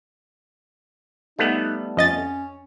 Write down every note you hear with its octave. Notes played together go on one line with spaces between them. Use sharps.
G3 A3 B3 D#4
F2 C#4 D#5 A6